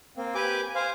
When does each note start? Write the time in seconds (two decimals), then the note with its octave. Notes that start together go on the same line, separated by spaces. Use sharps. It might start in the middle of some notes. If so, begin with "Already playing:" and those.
0.17 A#3 C4
0.35 G4 B4 G#5 D6
0.75 C5 F5 G#5